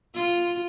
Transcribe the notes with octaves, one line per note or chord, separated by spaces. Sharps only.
F4